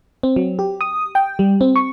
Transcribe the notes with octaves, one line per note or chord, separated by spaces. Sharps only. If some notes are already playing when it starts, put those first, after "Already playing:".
C4
F#3
G4
D#6
G5
G3
C4
C#6